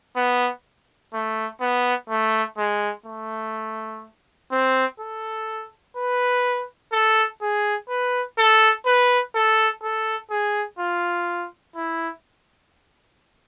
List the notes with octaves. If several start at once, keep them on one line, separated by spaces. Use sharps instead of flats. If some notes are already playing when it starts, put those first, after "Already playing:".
B3
A3
B3
A3
G#3
A3
C4
A4
B4
A4
G#4
B4
A4
B4
A4
A4
G#4
F4
E4